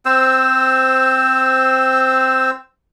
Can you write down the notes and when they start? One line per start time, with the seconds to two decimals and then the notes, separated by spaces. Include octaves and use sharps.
0.06 C4 C5 E6